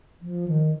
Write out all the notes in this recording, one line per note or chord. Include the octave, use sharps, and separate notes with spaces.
F3
D#3